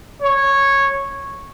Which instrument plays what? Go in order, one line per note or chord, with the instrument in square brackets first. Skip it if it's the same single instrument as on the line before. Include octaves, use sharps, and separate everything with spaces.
[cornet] C#5